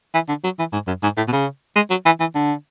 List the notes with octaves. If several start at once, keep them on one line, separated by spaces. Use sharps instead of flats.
E3
D3
F#3
E3
G#2
F#2
G#2
A2
B2
C#3
G#3
F#3
E3
E3
D3